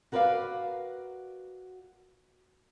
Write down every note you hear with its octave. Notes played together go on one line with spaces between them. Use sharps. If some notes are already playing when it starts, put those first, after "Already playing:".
F#4 A#4 B4 C#5 D5 F5